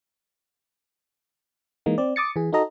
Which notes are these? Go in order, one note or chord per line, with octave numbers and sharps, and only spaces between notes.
E3 G#3 A#3 D#4
C4 D5
D6 D#6 A6 C#7
E3 G#4
D#4 F#4 A4 D#5 A#5